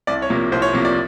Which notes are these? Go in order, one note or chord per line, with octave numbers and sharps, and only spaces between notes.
C2 D5
C#5
C3 F3 A#3
C2 C5
C#5
C3 F3 A#3
D5